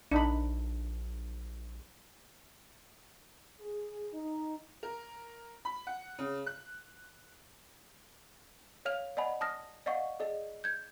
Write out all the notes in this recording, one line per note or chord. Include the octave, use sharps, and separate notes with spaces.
A#1 D4 D#4 B5
G#4
D#4
A#4
B5
F#5
C#3
F#6
C#5 F5 F6 F7
D5 D#5 F#5 G#5 B5
A5 D#6 F6 A#6
D5 D#5 F5 F#5 C#6
G#4 D5 D#5
G6 G#6